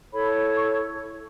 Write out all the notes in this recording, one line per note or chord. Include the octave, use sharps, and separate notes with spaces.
E4 A4 C#5 B5
C#6